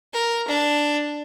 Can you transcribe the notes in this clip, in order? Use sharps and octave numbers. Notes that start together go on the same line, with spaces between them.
A#4
D4